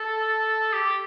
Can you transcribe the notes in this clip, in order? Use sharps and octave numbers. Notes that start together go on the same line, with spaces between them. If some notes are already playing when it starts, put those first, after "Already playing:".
Already playing: A4
G4